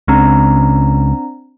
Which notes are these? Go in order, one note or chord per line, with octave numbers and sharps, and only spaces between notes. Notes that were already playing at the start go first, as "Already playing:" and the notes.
C#2 C#3 C4 D4 A#5